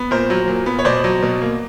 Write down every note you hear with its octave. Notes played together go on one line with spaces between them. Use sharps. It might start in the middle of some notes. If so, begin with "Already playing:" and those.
Already playing: B3
A#2 A#4 C5
F#3
A#2
B3
C#5
B2 C5 D5
F#3
B2
A#3